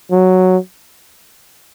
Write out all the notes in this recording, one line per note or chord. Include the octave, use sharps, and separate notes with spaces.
F#3